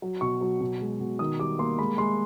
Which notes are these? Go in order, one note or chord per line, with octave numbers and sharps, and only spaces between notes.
F#3
B2 C#6
F#3
B2
G#3
B2
D#3 D#6
G3 D6
A#3 C6
G#3 B5
G#3 C6